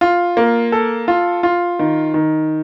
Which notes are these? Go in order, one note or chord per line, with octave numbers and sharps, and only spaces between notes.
F4
A#3
A4
F4
F4
D#3
D#3